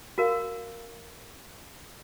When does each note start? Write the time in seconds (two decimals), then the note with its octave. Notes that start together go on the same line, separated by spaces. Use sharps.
0.18 F#4 A#4 F5